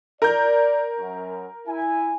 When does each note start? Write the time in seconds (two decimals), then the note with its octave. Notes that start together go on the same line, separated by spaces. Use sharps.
0.22 A#4 D5 G6
0.99 F#2
1.67 E4 G#5